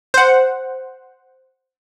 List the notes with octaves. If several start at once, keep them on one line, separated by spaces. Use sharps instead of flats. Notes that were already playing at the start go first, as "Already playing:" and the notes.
C5 F#5